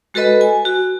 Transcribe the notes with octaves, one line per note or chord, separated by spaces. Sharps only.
G#3 F#4 A4 B4 D#5 B5
G#5
F#4